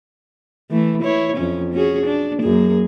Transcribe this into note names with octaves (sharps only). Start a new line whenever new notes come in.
E3 A3
E4 C#5
F2 C#4
C#4 F#4 G#4
D4
F#2 A#3 G#4